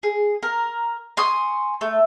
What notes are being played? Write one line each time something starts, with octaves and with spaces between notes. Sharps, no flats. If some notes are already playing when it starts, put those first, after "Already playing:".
G#4
A#4
G#5 C6 C#6 D#6
A3